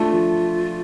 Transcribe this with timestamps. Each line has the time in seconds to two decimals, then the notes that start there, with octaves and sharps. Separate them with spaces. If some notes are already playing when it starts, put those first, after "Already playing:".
Already playing: A3 D4 F4
0.12 F3